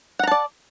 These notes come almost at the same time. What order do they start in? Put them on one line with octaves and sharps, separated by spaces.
F#5 A#5 A5 D5